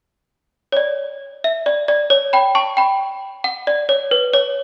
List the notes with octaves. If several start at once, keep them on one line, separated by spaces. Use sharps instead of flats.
C#5
D5
E5
D5
D5
C#5
G5 B5
A5 C#6
G5 B5
F#5
D5
C#5
B4
C#5